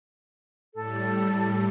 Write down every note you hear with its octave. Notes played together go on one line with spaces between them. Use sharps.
A2 G3 A4